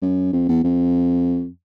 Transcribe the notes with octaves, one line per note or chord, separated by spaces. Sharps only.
F#2
F2
E2
F2